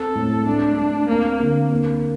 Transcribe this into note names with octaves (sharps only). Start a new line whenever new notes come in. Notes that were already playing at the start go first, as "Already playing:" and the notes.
Already playing: C4 A4
A2
A3 D4
A3
A#3 C4
D3
A#3